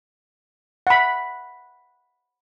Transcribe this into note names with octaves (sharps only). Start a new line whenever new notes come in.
F#5 B5